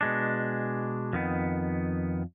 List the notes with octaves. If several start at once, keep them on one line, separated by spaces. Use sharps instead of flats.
B2 G#3 D4
F2 D#3 B3